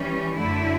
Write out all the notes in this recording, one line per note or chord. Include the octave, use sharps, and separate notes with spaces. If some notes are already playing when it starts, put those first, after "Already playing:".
Already playing: E3 G3 C#4
F#2 D3 A3 E4